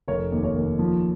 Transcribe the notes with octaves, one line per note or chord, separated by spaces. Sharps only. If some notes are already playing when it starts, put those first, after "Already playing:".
F1 A#4 C#5
D#2
A#4 C#5
D#2
F3